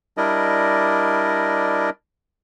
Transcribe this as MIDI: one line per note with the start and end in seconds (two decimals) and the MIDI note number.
0.17 1.90 55
0.17 1.90 62
0.17 1.90 64
0.17 1.90 70
0.17 1.90 74
0.17 1.90 75